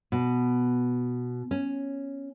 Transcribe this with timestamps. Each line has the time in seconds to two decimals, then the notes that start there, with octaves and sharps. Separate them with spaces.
0.12 B2
1.51 C#4